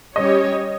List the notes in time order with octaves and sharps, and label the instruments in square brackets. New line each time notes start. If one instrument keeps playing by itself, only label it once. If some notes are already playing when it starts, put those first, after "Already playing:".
[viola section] G3 C#4 G4 C#5 [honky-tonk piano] D#5